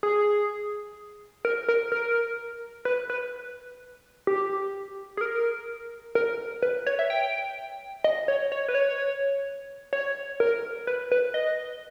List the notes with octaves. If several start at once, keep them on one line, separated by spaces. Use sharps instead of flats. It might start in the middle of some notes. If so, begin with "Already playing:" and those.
G#4
A#4
A#4
A#4
B4
B4
G4
G#4
A#4
A#4
B4
C#5
E5
G5
D#5
C#5
C#5
B4
C#5
C#5
A#4
B4
B4
D#5